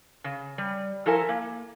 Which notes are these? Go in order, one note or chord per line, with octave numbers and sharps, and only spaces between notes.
C#3
G3
F3 E4 A4 A#4 G#5
A#3